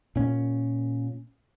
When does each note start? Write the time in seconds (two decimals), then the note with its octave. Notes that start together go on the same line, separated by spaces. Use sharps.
0.16 A#2 C#4